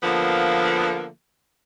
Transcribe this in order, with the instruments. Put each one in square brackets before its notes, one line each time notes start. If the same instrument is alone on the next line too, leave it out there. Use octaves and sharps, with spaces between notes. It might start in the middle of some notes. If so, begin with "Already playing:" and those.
[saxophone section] D3 F3 A#3 B3